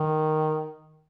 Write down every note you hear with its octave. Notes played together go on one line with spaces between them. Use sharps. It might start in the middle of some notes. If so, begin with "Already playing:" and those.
Already playing: D#3